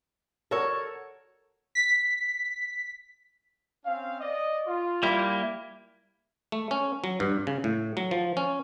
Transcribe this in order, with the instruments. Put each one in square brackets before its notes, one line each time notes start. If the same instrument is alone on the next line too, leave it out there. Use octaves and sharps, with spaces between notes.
[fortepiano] F#4 A#4 [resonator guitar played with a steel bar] A4 C#5
[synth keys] B6
[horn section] C4 C#4 F5
D5 D#5
F4
[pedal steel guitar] G3 A#3 E4
[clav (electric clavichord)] A3
C#4
F#3
G2
C#3
A2
F#3
F3
C#4